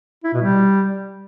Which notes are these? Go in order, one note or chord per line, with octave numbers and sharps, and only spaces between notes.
E4
B2
G3